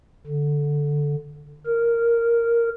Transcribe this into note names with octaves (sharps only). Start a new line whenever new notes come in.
D3
A#4